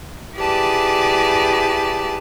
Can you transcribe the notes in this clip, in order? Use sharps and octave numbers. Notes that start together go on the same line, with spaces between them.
E4 G4 G#4 B4 D5 A5